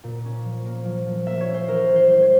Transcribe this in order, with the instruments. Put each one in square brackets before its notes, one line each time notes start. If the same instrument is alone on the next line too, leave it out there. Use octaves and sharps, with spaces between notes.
[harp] A#2
C#4
F3
A#3
F3
F3
A#3 E5
C#5
C#4
C5
E3 A#4
E3
C5
G3 C5
C#5